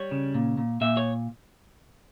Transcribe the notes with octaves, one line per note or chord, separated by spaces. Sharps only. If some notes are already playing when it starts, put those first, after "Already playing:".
Already playing: G3 C#5
C#3
A#2
A#2
A#2 E5
C#5